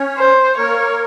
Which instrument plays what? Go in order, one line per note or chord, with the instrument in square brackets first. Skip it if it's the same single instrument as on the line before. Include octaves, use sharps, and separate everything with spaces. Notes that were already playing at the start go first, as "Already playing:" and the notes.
Already playing: [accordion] C#4 C#5
[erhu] C5
[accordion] A#3 A#4 [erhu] C#5